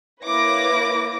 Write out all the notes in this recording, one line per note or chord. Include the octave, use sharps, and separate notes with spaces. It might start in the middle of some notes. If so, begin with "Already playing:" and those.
A#3 E4 B4 C#5 D6 A#6